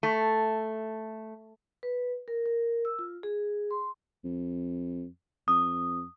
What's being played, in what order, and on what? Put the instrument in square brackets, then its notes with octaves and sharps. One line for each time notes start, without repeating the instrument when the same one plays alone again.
[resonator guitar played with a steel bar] A3
[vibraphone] B4
A#4
A#4
E6
F4
G#4
C6
[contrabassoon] F2
[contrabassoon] F2 [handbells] D#6